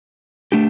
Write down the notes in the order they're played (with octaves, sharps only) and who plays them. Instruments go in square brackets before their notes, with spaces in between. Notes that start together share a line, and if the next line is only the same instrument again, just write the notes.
[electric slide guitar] A3 D4 G4